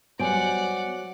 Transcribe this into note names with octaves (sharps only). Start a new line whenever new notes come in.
F#3 G3 B3 C5 D5 F#5 G#5 D7